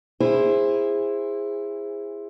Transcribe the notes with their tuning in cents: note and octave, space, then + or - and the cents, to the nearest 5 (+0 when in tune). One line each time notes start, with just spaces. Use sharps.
E4 +5 G#4 -25 C5 +10